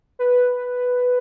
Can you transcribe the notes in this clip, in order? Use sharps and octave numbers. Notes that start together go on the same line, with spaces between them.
B4